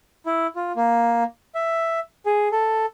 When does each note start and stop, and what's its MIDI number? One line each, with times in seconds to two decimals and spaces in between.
0.26 0.47 64
0.56 0.72 65
0.76 1.24 58
1.55 2.00 76
2.26 2.48 68
2.52 2.86 69